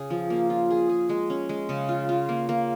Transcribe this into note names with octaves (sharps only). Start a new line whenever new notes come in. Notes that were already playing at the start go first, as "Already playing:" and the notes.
Already playing: C#3 C#4 G#4
F3
A#3
F4
G#4
G#4
G#3
C#4
G#3
C#3
F4
F4
A#3
A#3